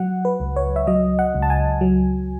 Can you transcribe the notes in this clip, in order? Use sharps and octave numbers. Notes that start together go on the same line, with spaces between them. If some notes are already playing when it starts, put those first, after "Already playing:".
Already playing: F#3 F#5
B4
C#2
C#5
E5
F#3 D#5
F#5
C#2
A5
G#5
F#3